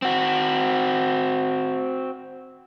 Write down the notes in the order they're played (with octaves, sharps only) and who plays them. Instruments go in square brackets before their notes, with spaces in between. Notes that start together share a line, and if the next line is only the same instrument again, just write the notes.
[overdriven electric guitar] C4 F#4